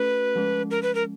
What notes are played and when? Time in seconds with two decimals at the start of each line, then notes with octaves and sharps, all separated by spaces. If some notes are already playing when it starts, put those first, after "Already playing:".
Already playing: A3 C#4 F#4 A4 B4
0.36 F3 G#3 C#4
0.71 A#4
0.83 B4
0.95 A#4